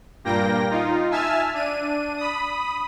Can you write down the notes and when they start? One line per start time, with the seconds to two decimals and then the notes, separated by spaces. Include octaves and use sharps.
0.24 G2 A#2 A#3 G5 A#6
0.70 D#4 F4
1.11 E5 G#5 A5 E6 F6
1.54 D4 D#7
2.17 B5 D#6